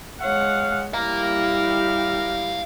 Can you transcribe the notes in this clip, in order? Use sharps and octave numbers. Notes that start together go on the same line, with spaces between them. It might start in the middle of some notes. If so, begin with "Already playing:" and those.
G#3 C#5 F5 F#5
G3 E4 G4 A#4 F5 A#5